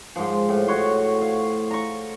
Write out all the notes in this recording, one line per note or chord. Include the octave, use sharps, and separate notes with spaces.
G#2 F3
A2
F#4 C#5 C6
F5
A#5 C#6